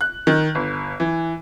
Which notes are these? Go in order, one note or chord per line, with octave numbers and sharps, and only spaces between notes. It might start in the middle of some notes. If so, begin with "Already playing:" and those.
F#6
D#3
G1
E3